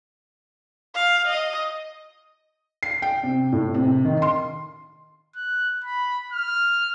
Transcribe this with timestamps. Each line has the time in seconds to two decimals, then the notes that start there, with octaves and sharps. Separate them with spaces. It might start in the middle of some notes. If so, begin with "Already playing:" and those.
0.94 F5
1.28 D#5
2.83 C7
3.02 G5
3.24 C3
3.53 A2
3.74 C3
4.05 D#3
4.22 C6
5.36 F#6
5.84 B5
6.33 F6